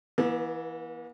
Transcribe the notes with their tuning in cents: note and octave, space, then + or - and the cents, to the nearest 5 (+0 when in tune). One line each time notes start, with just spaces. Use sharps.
E3 +0 B3 -45